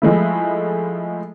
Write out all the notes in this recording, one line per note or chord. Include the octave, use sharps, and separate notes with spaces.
F3 G#3 A3 E4